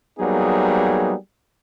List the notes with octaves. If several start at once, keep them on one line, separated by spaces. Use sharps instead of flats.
F#3 G3 A#3 B3 D#4 G#4